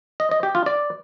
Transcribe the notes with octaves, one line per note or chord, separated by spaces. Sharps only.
D#5
D#5
G4
F4
D5